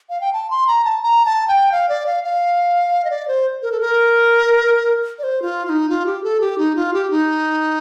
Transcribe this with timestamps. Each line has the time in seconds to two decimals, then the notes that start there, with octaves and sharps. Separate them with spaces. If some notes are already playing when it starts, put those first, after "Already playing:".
0.10 F5
0.21 G5
0.33 A5
0.50 C6
0.67 A#5
0.85 A5
1.03 A#5
1.25 A5
1.48 G5
1.72 F5
1.89 D5
2.06 F5
2.24 F5
3.05 D#5
3.11 D5
3.28 C5
3.62 A#4
3.72 A4
3.80 A#4
5.19 D5
5.23 C5
5.42 F4
5.66 F4
5.69 D#4
5.89 F4
6.06 G4
6.23 A4
6.41 G4
6.58 D#4
6.76 F4
6.94 G4
7.11 D#4